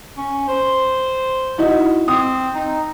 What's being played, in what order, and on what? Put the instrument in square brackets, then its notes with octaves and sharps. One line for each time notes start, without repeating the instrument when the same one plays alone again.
[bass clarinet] C#4
C5
[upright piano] D#4 E4 F#4
[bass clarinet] C4 [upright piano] D#6
[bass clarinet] D#4